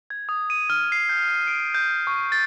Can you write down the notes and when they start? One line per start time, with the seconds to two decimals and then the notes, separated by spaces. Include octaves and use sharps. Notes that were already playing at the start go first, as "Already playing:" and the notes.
0.10 G#6
0.29 D#6
0.50 D#7
0.70 F6
0.92 C7
1.09 G6
1.47 D7
1.74 G6
2.07 C#6
2.32 A6